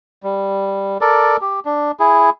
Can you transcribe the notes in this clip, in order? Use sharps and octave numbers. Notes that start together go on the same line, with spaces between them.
G3
A4 A#4 D5
G4
D4
E4 G#4